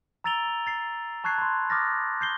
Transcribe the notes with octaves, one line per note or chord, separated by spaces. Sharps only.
A#5 E6 A6 D7 F7 G7
A6 C7
A5 C#6 F#6 G#6 C7
B5 C6
D6 D#6 F6 A6 A#6
G6 C7 G7